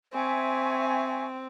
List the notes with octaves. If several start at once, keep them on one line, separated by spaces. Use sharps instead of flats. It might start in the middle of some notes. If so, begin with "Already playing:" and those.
C4 E5 G#5 C#6